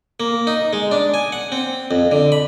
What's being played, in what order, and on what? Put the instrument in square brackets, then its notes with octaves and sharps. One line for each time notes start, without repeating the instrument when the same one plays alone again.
[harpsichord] A#3
D#4
G#3
D4
G#5
F#5
C4
F2
D3
B5